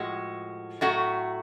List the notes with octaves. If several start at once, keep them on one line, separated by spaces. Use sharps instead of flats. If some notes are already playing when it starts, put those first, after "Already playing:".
Already playing: A2 F3 G#3 F#4
A2 F#3 A3 F#4